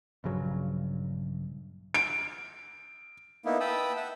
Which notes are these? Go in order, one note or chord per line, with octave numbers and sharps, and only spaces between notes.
A#1 G2 C#3 F#3
D7
A#3 B3 D#4 E4
B4 G5 A5 B5 D#6 E6
E5 F#5